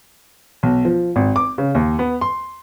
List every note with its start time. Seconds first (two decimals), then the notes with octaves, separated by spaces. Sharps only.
0.63 B1
0.85 F3
1.16 G#1
1.36 D6
1.58 C#3
1.75 D#2
1.99 B3
2.21 C6